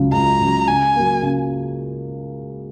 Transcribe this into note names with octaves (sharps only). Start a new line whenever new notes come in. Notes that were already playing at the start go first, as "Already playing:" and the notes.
Already playing: C#2 C#3 F#3
C#2 A#5
C#3 F#3
C#3 G#5
F#3 A#3
C#3